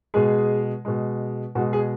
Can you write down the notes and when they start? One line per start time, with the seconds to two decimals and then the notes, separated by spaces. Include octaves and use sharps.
0.14 B2 G#3 G#4
0.85 B2 G#3
1.55 B2 G#3 F#4
1.73 G#4